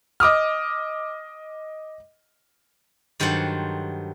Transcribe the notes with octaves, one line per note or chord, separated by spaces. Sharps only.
D#5 D6 D#6 F6
G2 D#3 F#3 A4 C5 F#5